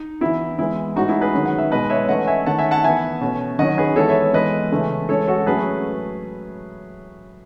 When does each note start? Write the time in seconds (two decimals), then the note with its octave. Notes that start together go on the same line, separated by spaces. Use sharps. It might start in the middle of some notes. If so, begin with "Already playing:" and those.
Already playing: D#4
0.21 E3 B3 E4
0.59 E3 G#3 B3 E4
0.96 A2 G#3 C#4 D#4 F#4
1.09 E4 G#4
1.21 G#4 B4
1.34 D#3 F#3 C#4
1.46 F#5
1.58 E5
1.71 B2 G#3 B3 B4 D#5
1.90 C#5 E5
2.09 E3 A3 C#4 D#5 F#5
2.27 E5 G#5
2.46 D#3 A3 C#4 F#5 A5
2.59 E5 G#5
2.71 F#5 A5
2.84 E3 B3 E5 G#5
3.21 B2 A3 C#4
3.59 D#3 F#3 C#4 D#5 F#5
3.78 G#4 B4
3.96 E3 G#3 B3 A4 C#5
4.09 C#5 E5
4.34 E3 G#3 B3 B4 D#5
4.72 C#3 E3 A3 C#4
5.09 E3 G#3 C#4 A4 C#5
5.28 F#4 A4
5.46 A2 F#3 A3 C#4 G#4 B4